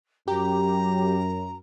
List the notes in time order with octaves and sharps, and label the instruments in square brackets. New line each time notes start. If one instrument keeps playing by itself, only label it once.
[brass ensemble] F#2 [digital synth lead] G4 [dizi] A#5